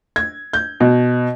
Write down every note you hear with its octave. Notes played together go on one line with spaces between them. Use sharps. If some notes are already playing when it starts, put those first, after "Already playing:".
G#6
G6
B2